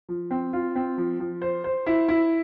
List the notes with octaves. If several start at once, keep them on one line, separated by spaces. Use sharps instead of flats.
F3
C4
F4
C4
F3
F3
C5
C5
E4
E4